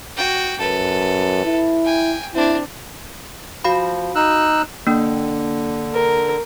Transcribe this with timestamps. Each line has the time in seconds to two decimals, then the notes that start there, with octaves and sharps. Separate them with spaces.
0.17 F#4 G5
0.60 F#2 A4 B4
1.45 E4
1.84 G5 G#5
2.34 C4 D4 E4
3.64 F3 F#4 F5 B5
4.15 D#4 E6 F#6
4.87 D3 A#3 D4
5.93 A#4